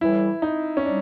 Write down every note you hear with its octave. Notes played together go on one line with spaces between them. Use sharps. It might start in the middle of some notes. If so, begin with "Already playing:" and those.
A2 E3 G3 E4
D#4
C#4
G3 D4